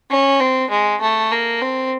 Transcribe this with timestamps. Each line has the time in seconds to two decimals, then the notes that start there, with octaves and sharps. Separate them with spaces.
0.10 C#4
0.40 C4
0.70 G#3
1.01 A3
1.32 A#3
1.61 C4